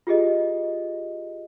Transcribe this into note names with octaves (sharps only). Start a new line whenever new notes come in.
F4 G4 G#4 D#5